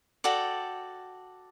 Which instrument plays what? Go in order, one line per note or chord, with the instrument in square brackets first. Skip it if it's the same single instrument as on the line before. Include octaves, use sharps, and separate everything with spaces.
[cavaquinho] F#4 A4 D5 G5